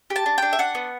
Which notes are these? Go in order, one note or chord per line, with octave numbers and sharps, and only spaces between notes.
G4
A5
D4
D4 G5
E5
D4 F#5
B3